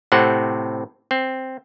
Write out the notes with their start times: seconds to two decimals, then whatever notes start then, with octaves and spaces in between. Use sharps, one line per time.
0.12 A2 C3 C4 F#5
1.11 C4